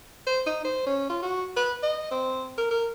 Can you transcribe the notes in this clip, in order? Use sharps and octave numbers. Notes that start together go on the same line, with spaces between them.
C5
D#4
C5
C#4
F4
F#4
B4
D#5
C4
A#4
A#4